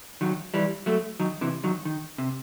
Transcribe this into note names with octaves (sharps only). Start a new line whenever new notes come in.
D#3 F#3
E3 G3
F#3 A3
D#3 F#3
C3 E3
D#3 F#3
D#3
C3